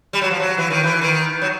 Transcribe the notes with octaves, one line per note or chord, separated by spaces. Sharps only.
G3
F#3
F3
F#3
E3
D#3
E3
D#3
F#3